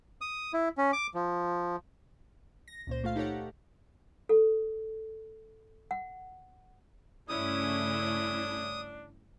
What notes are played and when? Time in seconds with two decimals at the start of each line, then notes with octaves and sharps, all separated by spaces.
0.21 D#6
0.53 E4
0.78 C#4
0.93 D6
1.14 F3
2.68 A#6
2.87 C#2 A#2 C5
3.04 A3 F4 F5
3.16 D#4 G4 A4 C#5 F#5
4.29 A4
5.91 F#5
7.29 G2 C#3 A3 C#4 D4 E4 D#6